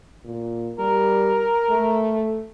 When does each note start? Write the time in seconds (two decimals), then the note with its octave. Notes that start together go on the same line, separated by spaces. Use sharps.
0.25 A#2
0.79 G3 A#4
1.69 A3